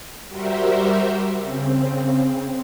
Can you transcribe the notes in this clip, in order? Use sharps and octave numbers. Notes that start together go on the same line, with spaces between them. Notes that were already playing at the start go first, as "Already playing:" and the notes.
G3 F#4 G4 A#4 C5 E5
C#3 C4